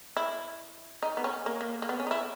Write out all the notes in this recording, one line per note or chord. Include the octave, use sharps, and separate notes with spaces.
E4
D#4
B3
C#4
A#3
A#3
A#3
B3
C#4
D#4
E4